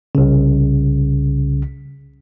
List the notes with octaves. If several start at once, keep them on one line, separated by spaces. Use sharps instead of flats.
C2 C#3